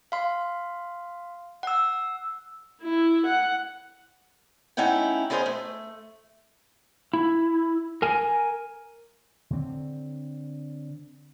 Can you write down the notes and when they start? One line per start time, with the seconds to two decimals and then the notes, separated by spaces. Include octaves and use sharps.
0.12 F5 C6
1.63 F#5 E6
2.82 E4
3.26 F#5
4.77 A3 C#4 D#4 E4 F#5 G5
5.30 B3 C#4 G#4 A#4 C5 D#5
5.46 A3
7.13 E4
8.02 A#4 G#5
9.50 D3 C4